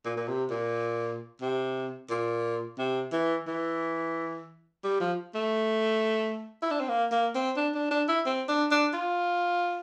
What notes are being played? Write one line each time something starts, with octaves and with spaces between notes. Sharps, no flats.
A#2
A#2
C3
A#2
C3
A#2
C3
E3
E3
G3
F3
A3
E4
D4
C4
A#3
A#3
C4
D4
D4
D4
E4
C4
D4
D4
F4